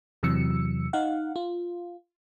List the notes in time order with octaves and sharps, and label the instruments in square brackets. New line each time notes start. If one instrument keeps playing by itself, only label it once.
[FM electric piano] E2 C3 E3 F#3 E6 C#7
D#4 F5 F#5
F4